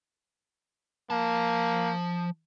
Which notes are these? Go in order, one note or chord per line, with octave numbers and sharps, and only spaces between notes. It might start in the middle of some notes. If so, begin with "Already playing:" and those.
F3 A#3 A5